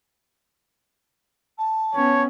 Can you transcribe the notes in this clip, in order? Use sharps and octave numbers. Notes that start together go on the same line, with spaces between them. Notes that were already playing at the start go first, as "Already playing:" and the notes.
A5
B3 C#4 C#5